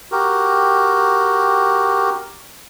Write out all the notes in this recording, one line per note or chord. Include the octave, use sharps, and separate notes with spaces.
F#4 G4 A#4